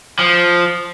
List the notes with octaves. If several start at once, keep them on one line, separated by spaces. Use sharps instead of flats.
F3